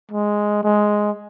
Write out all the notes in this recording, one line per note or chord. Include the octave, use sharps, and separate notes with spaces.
G#3
G#3